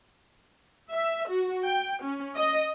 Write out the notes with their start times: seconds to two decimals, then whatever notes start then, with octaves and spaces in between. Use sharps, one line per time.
0.91 E5
1.29 F#4
1.65 G5
2.02 C#4
2.35 D#5